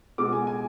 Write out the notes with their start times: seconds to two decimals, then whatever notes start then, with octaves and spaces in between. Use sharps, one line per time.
0.18 B2 G#3 D6
0.33 G#5
0.47 G#5